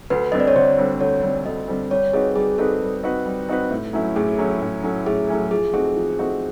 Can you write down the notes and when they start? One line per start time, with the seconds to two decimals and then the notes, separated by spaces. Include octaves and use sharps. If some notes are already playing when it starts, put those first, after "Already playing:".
0.10 D2 B4
0.32 D3 G3 C4 D#5
0.40 D5
0.48 C#5
0.56 D2 C5
0.78 D3 G3 C4
1.01 D2 C#5
1.23 D3 G3 C4
1.46 D2 D#5
1.68 D3 G3 C4
1.90 G3 C#5
2.13 C4 D#4 F#4 G#4 B4
2.35 G3 G#4
2.58 C4 D#4 F#4 A4 B4
2.81 G3
3.03 C4 D#4 F#4 B4
3.26 G3
3.49 C4 D#4 F#4 B4
3.71 A2
3.93 F#3 A3 C#4 E4
4.16 A2 G#4
4.38 F#3 A3 C#4 E4
4.62 A2
4.83 F#3 A3 C#4 E4
5.06 A2 G#4
5.29 F#3 A3 C#4 E4
5.51 F3 G#4
5.73 A3 C4 D#4 F#4 G#4
5.96 F3
6.19 A3 C4 D#4 F#4